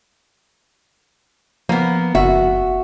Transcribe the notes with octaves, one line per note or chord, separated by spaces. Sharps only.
F3 A#3 B3
F#1 F#4 E5